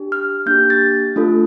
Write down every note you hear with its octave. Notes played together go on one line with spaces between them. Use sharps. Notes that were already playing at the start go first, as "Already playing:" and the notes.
Already playing: D4 G4
F6
A#3 D4 G4 G6
A6
A3 D4 F4 A4